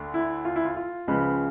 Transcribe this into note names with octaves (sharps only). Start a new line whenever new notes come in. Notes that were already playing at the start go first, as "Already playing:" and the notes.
Already playing: D2 D3
E4
F4
E4
F4
F4
C#2 C#3 F3 G#3 B4